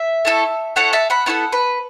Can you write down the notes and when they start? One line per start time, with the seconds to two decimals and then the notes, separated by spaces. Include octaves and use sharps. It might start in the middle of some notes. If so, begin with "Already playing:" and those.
Already playing: E5
0.25 A3 E4 A4
0.76 A3 E4 A4 C#5 F#5
0.93 E5 A5
1.10 F#5 B5
1.26 B3 E4 A4 C#5 F#5
1.52 B4